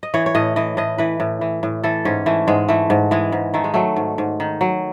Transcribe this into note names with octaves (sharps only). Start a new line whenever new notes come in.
D#5
E3 C#5
C#5
A2 D#5
E3 D#5
A2 D#5
E3 B4
A2
E3
A2
E3 A4
G#2 C#4
E3 A3
G#2 G#3
E3 A3
G#2
E3 G#3
G#2
D#3 A3
G#3
F#3 A3
G#2
G#2
D#3
F#3